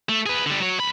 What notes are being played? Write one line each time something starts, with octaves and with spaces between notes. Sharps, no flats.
A3
G#4 B4
D3 G3
F#3 C#5
D2 B5